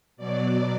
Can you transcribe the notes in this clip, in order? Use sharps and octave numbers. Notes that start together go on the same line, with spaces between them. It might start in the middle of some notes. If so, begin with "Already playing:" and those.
B2 F#3 D5